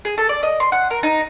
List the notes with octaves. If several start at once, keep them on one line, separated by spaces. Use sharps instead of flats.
G#4
A4
D5
D#5
C6
F#5
A#4
D#4